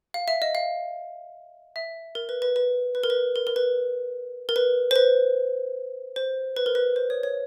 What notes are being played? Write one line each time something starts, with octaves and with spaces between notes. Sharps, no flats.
F5
E5
D#5
F5
E5
A#4
B4
B4
B4
B4
A#4
B4
A#4
A#4
B4
A#4
B4
C5
B4
C5
B4
A#4
B4
C5
C#5
C#5